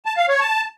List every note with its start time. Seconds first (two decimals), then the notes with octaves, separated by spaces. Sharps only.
0.05 A5
0.17 F5
0.29 C#5
0.40 A5